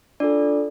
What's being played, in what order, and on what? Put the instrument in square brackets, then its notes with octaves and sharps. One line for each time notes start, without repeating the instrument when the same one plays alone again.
[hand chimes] D4 F4 A4 D5